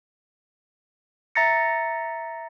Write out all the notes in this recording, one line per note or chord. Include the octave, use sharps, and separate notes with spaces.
E5 A#5 A6 A#6 C#7